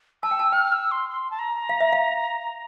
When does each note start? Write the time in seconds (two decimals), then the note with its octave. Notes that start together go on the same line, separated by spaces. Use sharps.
0.23 A5 E6
0.31 G5
0.39 A5
0.52 G5 F6
0.72 E6
0.91 C6
1.10 C6
1.31 A5
1.39 A#5
1.69 F5
1.80 E5
1.93 F5